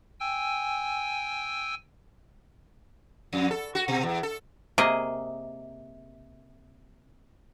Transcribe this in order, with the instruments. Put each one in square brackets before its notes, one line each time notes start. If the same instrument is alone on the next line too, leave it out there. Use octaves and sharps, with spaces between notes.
[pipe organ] G5 G#5 E6
[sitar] F2
A4
F#4
B2
E2
A4
[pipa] C3 [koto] A#3 G#4 D#5